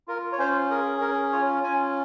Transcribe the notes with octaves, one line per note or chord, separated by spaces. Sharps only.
F4 A#4
C#5
C#4 C5
G#4 A#4
C#4 A#4
F4 C#5
C#4 G#5